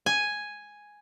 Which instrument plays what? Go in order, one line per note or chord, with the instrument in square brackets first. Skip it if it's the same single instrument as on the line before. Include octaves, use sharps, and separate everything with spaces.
[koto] G#5